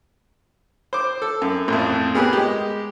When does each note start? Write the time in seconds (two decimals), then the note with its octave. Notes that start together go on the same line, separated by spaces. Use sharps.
0.93 C5 D6
1.22 A4
1.42 F#2
1.68 A1 F2
2.15 B3 G4 G#4 A#4
2.33 G#3 G4